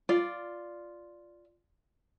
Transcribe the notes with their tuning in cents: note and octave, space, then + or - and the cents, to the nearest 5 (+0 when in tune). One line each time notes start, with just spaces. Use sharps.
F4 +0 D5 +0